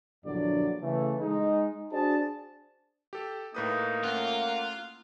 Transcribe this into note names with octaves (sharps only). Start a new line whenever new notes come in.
A#1 E2 G2 D3 F#3 D5
C#3 E3 A3
G#3 D#4
D4 F#4 G#4 C5 D5 A5
G4 A4
A2 A#3 D#4 B4 D#6
A3 C#4 F4 F#5